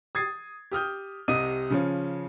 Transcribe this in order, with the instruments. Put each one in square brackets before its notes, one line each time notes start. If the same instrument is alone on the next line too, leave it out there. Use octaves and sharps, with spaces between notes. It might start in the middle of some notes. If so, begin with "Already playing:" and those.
[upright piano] D#6 G#6 A6 C7
G4 D#6 F6 G6
C2 C3 D#5 D#6 D#7
C#3 F3 C#4